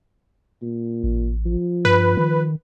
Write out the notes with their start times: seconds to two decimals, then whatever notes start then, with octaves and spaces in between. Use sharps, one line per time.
0.62 A#2
1.04 A1
1.46 F3
1.85 G2 B4
2.17 D#3